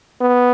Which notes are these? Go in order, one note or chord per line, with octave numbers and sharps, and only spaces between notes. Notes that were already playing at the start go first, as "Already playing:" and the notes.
B3